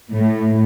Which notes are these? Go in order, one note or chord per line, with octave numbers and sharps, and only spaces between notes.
A2